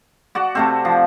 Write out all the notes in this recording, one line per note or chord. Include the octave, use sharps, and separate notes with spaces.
F#4 D5 F#5
C3 A3 C4
F3